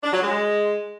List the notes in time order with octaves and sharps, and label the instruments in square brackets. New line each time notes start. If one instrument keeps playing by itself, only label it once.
[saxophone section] D4
F#3
G#3